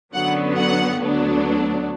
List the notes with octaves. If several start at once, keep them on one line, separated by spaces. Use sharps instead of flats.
F#2 D3 F#3 B3 F#5
F#5
D2 D3 F#3 B3 D4